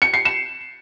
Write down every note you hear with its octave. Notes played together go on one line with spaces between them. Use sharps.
C#7
C7
E7